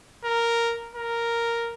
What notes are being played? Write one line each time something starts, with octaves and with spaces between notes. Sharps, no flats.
A#4
A#4